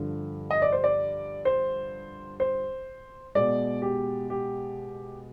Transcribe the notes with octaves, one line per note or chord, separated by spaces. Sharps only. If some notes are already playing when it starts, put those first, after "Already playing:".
Already playing: G2 D3 F3
D#5
D5
C5
D5
C5
C5
B2 G#3 D5
G4
G4